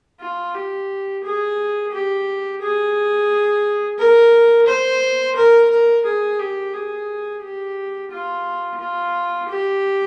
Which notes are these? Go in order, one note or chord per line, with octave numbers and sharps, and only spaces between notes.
F4
G4
G#4
G4
G#4
A#4
C5
A#4
A#4
G#4
G4
G#4
G4
F4
F4
G4